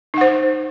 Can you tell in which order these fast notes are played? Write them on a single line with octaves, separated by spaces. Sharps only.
D#4 F#5 C5